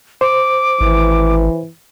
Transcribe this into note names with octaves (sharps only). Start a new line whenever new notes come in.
C5 D6
G#1 E3